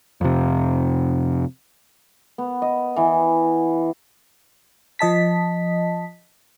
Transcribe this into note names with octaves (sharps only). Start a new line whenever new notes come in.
F2 C3
B3
D#5
E3
F3 D#5 A5 B6